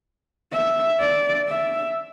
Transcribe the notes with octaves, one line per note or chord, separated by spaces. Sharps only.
E5
D5
E5